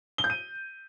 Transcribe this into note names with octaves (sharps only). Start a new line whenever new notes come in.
G7
G6
D#7